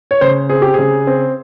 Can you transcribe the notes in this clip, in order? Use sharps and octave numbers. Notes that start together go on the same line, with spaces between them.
C#5
C#3 C5
C4 G#4
G4
C#3 G#4
C4